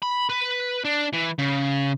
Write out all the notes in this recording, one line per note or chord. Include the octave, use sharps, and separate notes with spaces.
B5
B4
D4
E3
C#3